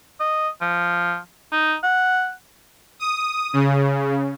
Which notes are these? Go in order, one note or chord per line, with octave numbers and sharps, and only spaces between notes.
D#5
F3
D#4
F#5
D#6
C#3